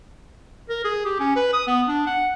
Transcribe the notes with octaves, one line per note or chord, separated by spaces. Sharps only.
A#4
G#4
G4
C#4
B4
D#6
B3
D4
F#5